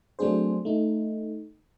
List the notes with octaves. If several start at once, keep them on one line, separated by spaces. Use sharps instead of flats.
F#3 A3 C4 D4 G#4 C5
A3 D#4